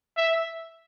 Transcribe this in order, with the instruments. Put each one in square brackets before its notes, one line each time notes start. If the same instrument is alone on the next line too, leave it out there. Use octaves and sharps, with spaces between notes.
[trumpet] E5